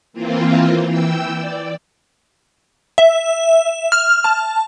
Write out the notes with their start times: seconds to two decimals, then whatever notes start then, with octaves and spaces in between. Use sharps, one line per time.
0.13 E3 A#3 C4 F4
0.87 E3 G5 E6
1.32 D5
2.98 E5
3.92 F6
4.24 A5